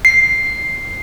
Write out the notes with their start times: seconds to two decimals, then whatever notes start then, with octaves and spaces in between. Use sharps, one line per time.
0.05 C7